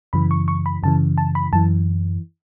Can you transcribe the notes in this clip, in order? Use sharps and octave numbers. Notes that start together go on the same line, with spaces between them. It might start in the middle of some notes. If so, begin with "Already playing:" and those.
F#2 C#3 E3 B5
C#6
C#6
B5
F#2 C#3 E3 A5
A5
B5
F#2 E3 A5